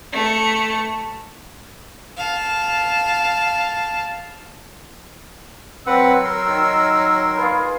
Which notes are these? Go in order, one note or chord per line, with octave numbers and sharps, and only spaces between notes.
A3 C#7
F5 A5
F#3 C4 B4 F#5 E6
A#4 C6
D#3
F4 G#4 B4